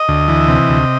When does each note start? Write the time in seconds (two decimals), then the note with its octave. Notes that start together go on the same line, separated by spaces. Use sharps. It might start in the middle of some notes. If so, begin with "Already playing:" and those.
Already playing: D#5
0.08 D2
0.28 E3
0.48 C3
0.69 D2